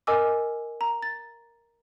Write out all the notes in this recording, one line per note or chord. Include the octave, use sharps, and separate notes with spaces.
A#4 D#5 G#5 D6 E6
A#5
A6